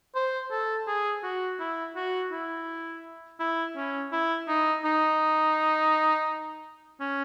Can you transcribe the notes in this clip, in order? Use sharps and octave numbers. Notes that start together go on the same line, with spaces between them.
C5
A4
G#4
F#4
E4
F#4
E4
E4
C#4
E4
D#4
D#4
C#4